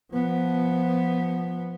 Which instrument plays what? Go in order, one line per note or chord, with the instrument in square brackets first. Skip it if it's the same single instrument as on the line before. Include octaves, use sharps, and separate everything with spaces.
[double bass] F3 B3